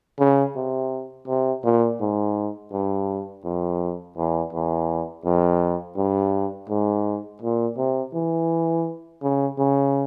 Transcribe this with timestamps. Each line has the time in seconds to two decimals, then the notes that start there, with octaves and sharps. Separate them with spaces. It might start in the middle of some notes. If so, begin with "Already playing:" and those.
0.19 C#3
0.56 C3
1.27 C3
1.64 A#2
2.01 G#2
2.72 G2
3.45 F2
4.17 E2
4.53 E2
5.25 F2
5.97 G2
6.69 G#2
7.42 A#2
7.77 C3
8.14 E3
9.22 C#3
9.58 C#3